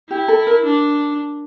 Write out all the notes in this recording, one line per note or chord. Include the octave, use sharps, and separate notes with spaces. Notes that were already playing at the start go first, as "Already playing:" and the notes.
E4 G4
A4
A#4
D4